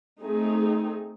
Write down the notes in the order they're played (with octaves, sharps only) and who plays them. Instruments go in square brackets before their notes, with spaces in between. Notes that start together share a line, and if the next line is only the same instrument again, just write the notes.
[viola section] A3 C4 D#4 G#4